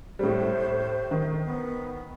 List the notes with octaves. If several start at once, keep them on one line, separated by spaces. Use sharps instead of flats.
A2 G3 C5
D#3
B3